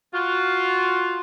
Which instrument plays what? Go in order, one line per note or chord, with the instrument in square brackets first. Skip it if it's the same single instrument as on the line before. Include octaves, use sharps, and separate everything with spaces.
[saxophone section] F4 [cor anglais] F#4